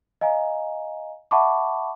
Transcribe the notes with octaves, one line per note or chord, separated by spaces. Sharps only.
D#5 F5 G#5 A#5
E5 F#5 A5 B5 C#6 D6